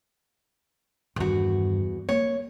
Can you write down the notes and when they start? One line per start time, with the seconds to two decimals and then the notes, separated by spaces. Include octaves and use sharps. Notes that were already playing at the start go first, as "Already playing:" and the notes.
1.16 E2 G2 D#3 F#4
2.09 A#3 C#5